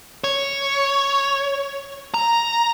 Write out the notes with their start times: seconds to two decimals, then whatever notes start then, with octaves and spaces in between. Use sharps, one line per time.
0.24 C#5
2.14 A#5